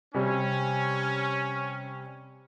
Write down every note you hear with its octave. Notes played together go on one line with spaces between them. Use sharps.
C3 G3 C#4